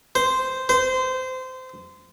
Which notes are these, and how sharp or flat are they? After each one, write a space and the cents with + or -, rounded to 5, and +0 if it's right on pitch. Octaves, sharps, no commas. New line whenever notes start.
C5 -10
C5 -25